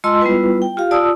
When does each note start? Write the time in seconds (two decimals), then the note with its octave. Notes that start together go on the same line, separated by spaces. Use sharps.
0.04 G#3 F4 D#5 A5 C6 E6
0.21 G3 B3 E4 F4 B4
0.62 G5
0.77 F4 G4 F5
0.91 F4 D5 A5 D#6 E6